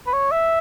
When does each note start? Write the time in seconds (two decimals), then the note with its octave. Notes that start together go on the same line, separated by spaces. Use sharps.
0.07 B4
0.13 C#5
0.32 E5